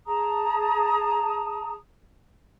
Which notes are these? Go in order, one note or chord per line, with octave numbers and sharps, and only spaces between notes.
G#4 A5 A#5 D#6